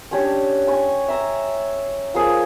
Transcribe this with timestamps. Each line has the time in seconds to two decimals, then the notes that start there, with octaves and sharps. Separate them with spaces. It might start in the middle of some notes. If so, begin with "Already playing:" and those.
0.11 C#4 D4 G4 C#5
0.67 G#5 C#6
1.08 E5 A#5
2.14 F3 A#3 G#4